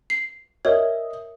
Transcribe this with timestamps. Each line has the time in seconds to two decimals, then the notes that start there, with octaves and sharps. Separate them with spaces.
0.10 C7
0.65 A#4 C#5 D#5 E5